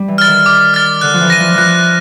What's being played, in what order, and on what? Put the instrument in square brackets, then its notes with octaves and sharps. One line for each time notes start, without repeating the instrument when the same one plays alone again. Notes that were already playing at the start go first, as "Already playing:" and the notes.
Already playing: [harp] G3
E3
[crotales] F6 A6
[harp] D#3
[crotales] D6
F6 A6
[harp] D3 [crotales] F#6
[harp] F3
E3
[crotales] A#6 D#7
[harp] F3
[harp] E3 F3 [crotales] F#6